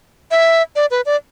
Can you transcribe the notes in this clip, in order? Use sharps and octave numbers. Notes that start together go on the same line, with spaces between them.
E5
D5
B4
D5